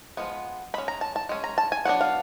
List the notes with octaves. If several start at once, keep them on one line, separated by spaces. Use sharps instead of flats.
F3 G#3 B3
G#3 C#4 B5
A#5
A5
A5
G#3 C#4
A#5
A5
G#5
F#3 B3 D4 F#5
F5